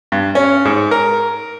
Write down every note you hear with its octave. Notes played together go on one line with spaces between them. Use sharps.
G2
C#4
G#2
A#4